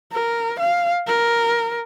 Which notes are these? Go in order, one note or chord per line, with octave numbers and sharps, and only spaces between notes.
A#4
F5
A#4